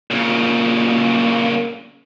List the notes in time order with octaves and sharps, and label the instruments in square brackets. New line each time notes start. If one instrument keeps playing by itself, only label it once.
[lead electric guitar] A#2 C#3